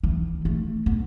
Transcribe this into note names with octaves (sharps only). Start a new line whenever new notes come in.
E3
A3
B3